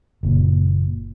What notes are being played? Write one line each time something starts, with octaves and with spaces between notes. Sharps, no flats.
F#1 A#2